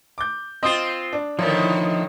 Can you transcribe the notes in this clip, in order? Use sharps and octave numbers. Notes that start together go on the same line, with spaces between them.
D6 G6
C4 F4 D#5 C6 D#6 G6 C7
D4
A2 D3 D#3 F3 D#4 E4 C#5